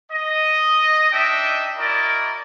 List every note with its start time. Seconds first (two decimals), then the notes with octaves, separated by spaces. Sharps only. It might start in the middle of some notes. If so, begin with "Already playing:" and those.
0.12 D#5
1.12 D4 D#4 D#5 E5 G5
1.78 E4 F#4 A#4 D5 D#5